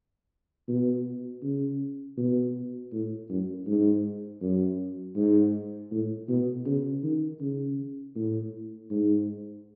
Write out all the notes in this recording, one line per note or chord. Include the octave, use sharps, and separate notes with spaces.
B2
C#3
B2
A2
F#2
G#2
F#2
G#2
A2
B2
C#3
D#3
C#3
A2
G#2